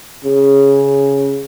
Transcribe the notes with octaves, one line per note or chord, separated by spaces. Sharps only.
C#3